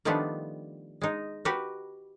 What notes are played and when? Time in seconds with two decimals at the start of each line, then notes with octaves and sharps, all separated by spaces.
0.05 D#3 F3 G3 A3 B3 D4
1.02 G#3 D#4
1.45 F#4 G4 A#4 B4